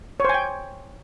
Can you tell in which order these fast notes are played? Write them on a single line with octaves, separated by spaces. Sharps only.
C#5 C5 G#5 G5